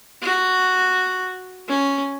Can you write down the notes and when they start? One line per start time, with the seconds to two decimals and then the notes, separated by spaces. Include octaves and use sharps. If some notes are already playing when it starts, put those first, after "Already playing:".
0.22 F#4
1.68 C#4